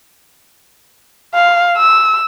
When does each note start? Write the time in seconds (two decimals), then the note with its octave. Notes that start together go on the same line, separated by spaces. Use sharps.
1.34 F5
1.77 E6